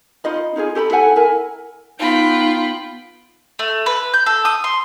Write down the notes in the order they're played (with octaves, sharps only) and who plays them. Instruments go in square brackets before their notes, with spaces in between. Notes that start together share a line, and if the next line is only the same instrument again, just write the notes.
[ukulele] D#4 F4 D#5 B5
D#4 F4 G4 G#4
G4 A4 A#5 B5
E4 A4 F#5 G#5
E4 A#4 G#5
[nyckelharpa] B3 G5 [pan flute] D#4 [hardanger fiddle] F4 B5
[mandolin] A3
B4
G6
A4
D#6
C6